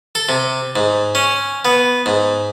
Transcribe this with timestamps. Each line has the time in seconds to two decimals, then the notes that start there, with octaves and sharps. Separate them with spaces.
0.15 A4
0.29 C3
0.76 G#2
1.15 C#4
1.65 B3
2.06 G#2